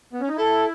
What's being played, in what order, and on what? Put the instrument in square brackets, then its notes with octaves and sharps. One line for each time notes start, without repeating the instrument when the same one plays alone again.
[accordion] B3
C#4
D#4
[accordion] E4 [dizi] A4